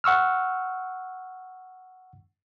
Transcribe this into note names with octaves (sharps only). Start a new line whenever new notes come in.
F#5 C#6 E6 F6